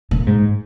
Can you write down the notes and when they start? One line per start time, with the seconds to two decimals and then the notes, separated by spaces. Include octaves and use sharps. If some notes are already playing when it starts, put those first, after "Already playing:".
0.11 A#2
0.27 G#2